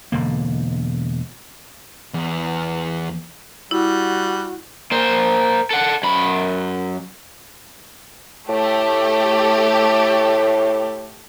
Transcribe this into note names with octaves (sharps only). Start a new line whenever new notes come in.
E1 D3 A#3
E2
G3 E4 F#4
A#3 C5
A4 F#5
F#2 B5
A2 A3 G4